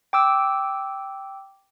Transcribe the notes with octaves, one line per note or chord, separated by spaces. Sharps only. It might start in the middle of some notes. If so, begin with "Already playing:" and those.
G5 D6 E6